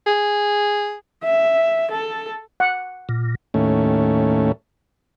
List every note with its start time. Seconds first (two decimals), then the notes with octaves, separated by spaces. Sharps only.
0.07 G#4
1.24 E5
1.91 A4
2.60 F#5
3.09 A#2
3.54 D#2 A2 A3 C#4